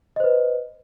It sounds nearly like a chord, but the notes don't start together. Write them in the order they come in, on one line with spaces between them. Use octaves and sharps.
D#5 C5 B4